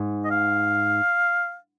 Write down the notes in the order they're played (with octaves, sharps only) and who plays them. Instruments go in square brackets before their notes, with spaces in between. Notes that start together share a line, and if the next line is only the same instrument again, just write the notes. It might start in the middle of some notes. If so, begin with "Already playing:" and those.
Already playing: [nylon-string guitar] G#2
[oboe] D#5
F5